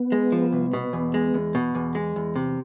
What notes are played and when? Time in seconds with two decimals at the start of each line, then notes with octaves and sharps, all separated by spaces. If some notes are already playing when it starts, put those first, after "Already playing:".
Already playing: B3
0.12 G#3
0.32 F3
0.52 C2
0.73 B2
0.93 E2
1.14 G#3
1.34 E2
1.55 B2
1.75 E2
1.95 G#3
2.16 E2
2.36 C3